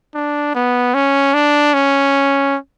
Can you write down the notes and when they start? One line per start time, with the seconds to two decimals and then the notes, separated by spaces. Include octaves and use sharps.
0.15 D4
0.55 B3
0.94 C#4
1.34 D4
1.74 C#4